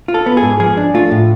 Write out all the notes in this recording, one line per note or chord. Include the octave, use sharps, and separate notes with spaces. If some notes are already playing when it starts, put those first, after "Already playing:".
F4
A4
B3
G#4
G#2
F3 G#4
D4
A3 F4
A2